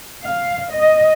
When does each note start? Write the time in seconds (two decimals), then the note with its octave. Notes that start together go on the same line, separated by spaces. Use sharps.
0.23 F5
0.71 D#5